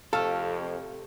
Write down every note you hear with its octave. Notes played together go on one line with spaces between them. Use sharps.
F2 C3 A3 A4 F5 F6